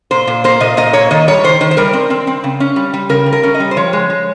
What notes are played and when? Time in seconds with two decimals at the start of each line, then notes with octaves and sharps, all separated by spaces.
0.11 A#2 C5
0.27 A#2
0.44 A#3 C5
0.60 A#2 D#5
0.77 A#2 D#5
0.93 A#3 C#5
1.11 D#3 D#5
1.28 G3 C#5
1.44 D#3 C5
1.61 D#3 C5
1.71 C5
1.77 G3 A#4
1.93 C4
2.10 C4
2.27 C4
2.44 C#3
2.60 C#4
2.76 G3
2.94 G3
3.09 C#3 A#4
3.26 G3
3.33 A#4
3.43 C#4
3.54 D#5
3.60 G3
3.71 C5
3.77 F3 C#5
3.93 G#3
4.10 G#3